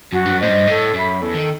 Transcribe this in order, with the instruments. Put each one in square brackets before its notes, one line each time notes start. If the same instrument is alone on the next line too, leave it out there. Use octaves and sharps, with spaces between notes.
[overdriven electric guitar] F#2 [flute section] F#4
[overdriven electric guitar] G2
F#2
[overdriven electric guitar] A2 [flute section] C5 D#5
[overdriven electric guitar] G2
[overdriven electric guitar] A2 [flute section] A4
[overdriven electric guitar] F#2 [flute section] E5 B5
[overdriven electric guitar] E2 [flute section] A4
[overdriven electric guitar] D#3